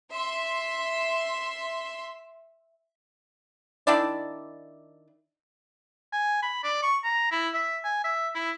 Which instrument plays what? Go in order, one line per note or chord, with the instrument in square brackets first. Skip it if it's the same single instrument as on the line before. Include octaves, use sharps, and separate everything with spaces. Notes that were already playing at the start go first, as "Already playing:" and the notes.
[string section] E5 C6
[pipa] D#3 D4 E4 D5
[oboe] G#5
B5
D5
C#6
A#5
E4
E5
G#5
E5
E4